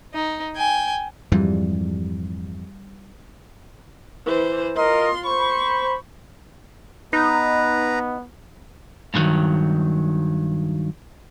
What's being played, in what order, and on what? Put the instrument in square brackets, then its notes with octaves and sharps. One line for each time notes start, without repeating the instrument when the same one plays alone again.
[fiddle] D#4
G5 G#5
[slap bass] F2 G#2 E3 [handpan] G3
[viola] E3 C5
[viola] F4 C6 [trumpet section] A#4 D#5
[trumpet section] C5 B5 [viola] C#6
[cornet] B3 [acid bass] D#4 [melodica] B4 A#5
[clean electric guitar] G2 B2 D3 D#3 F#3